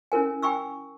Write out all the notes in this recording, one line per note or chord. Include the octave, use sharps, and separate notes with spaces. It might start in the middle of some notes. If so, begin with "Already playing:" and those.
C#4 E4 A#4 G#5
G5 G#5 B5 C#6 E6